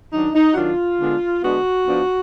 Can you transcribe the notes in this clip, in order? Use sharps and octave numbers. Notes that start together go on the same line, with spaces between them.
D#3 F#3 D4 D#4
D#4
F#4
D#3 F#3 D4 F4
D3 G#3 B3 D4
D3 G#3 B3 D4 F#4
F3 B3 D4